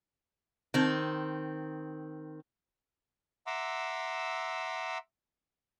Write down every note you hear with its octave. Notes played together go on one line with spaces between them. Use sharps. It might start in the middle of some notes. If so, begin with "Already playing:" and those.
D#3 C4
E5 F#5 A#5 C6 D6 E6